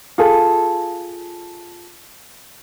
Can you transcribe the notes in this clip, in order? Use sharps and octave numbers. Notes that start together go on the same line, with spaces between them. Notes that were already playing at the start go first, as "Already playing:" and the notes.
F4 G#4 A4